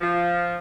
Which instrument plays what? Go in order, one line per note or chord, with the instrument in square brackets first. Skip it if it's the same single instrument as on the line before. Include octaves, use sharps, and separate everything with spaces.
[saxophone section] F3